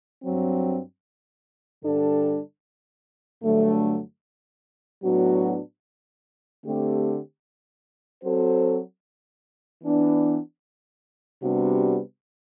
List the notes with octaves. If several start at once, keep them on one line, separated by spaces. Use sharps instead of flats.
G2 F#3 C4
G2 D3 G3 D4 A4
G2 D3 F#3 A3
A2 F#3 B3 D4 F#4
D3 A3 C4 G4
F#3 C4 F#4 A4 C5
E3 B3 D4
C3 G3 B3 D4 F#4